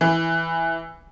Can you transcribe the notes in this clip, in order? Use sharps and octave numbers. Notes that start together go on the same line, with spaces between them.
E3